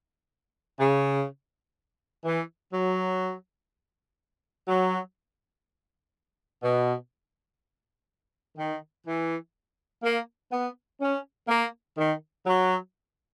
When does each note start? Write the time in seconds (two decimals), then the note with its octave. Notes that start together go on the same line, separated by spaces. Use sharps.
0.79 C#3
2.25 E3
2.73 F#3
4.68 F#3
6.63 B2
8.57 D#3
9.05 E3
10.03 A#3
10.52 B3
11.01 C#4
11.48 A#3
11.97 D#3
12.46 F#3